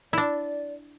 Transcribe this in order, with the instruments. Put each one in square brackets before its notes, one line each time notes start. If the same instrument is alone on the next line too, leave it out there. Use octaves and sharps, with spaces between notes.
[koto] D4 E4 [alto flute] D5